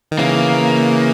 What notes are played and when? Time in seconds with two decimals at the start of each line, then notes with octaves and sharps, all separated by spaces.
0.11 D#3
0.18 C#3 E3 A#3